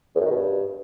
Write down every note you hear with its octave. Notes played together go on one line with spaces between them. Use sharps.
E2
F#2
D#3
B2
G2